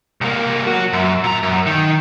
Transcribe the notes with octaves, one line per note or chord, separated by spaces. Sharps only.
C2 A#3
F#3 F#4
F#2
A#2 A#5
F#2
D#3